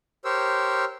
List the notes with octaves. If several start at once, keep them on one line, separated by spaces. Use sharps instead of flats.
G4 A#4 C5 C#5 E6